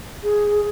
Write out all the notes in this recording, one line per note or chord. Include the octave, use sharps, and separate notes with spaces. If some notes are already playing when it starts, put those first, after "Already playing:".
G#4